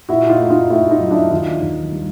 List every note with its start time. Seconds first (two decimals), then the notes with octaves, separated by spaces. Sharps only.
0.09 A#2 E4 F#4
0.29 D#4 F4
0.39 A3
0.50 D#4 F4
0.70 A3 E4 F#4
0.91 D#4 F4
1.00 F#3
1.11 D4 E4
1.31 D#2 D#4 F4
1.61 D#2
1.92 G3